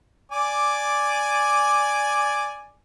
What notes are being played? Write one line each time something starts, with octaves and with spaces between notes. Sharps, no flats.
D5 G#5 D6